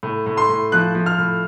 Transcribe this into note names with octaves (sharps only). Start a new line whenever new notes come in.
A2
A2
C6
A2
F3 F#6
F3
F6
A2